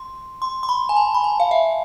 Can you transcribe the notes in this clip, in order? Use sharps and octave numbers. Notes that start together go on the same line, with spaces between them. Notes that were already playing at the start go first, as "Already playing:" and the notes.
Already playing: C6
C6
C6
B5
G#5
A5
B5
A5
F5
E5